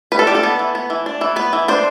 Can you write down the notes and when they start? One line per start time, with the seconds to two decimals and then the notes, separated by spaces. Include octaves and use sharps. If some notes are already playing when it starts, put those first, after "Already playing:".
0.12 G3 B4
0.19 A4
0.27 D4 G4
0.35 A4
0.43 B3
0.59 E3
0.75 B3
0.90 E3
1.06 D4
1.21 E3
1.36 B3 B4
1.53 E3
1.68 D4 C5